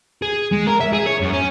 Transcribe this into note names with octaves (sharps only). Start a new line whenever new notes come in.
G#4
G#3
A#4
E5
G#4
C#5
F#2
C#4